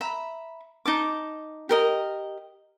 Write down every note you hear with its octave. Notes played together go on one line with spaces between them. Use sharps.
E5 A#5 B5
D#4 A5 D6
G4 A#4 D#5